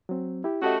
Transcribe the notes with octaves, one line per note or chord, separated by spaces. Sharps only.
F#3 C4
E4 G4
A3 C#4 F#4 G4 D#5